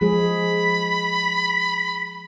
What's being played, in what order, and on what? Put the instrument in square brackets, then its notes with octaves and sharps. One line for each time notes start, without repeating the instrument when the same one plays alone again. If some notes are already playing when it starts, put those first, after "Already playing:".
[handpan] F3 G#3 G#4 [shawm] B5